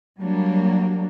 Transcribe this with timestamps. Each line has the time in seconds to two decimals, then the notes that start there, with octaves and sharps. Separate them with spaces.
0.20 F#3 G3 A#3 D4